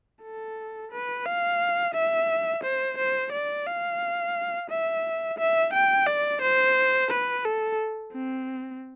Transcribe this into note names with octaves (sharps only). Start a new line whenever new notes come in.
A4
B4
F5
E5
C5
C5
D5
F5
E5
E5
G5
D5
C5
B4
A4
C4